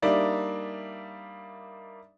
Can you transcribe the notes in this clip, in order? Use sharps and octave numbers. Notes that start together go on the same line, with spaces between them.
G3 A#3 D4 D#4 D5 E5